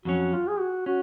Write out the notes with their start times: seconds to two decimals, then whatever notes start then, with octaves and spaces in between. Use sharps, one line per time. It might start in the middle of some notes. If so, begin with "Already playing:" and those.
0.05 F2 D#3 F#3 C#4 F#4
0.33 F4
0.48 G#4
0.59 F#4
0.86 C#4 F#4